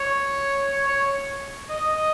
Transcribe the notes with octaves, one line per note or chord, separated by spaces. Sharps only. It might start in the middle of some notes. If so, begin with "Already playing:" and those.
Already playing: C#5
C#5
C#5
D#5